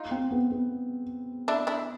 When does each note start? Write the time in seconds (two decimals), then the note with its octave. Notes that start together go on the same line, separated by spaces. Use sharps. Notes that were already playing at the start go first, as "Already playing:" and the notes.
Already playing: D#4 F4
0.11 C4
0.31 B3
0.50 B3
1.48 D4 E4
1.67 D4 E4